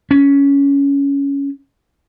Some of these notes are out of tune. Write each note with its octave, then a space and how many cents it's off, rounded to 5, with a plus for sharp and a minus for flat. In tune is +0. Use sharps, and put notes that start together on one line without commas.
C#4 +10